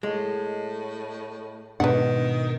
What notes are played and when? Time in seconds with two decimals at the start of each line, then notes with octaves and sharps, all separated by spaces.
0.03 A2 G#3
1.80 G#2 B2 D#3 D4 B4 F#5